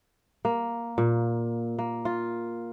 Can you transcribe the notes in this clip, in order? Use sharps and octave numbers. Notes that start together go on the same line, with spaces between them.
A#3
A#2
A#3
F4